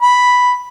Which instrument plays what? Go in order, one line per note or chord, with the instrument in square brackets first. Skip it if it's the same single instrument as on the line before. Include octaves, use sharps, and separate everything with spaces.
[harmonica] B5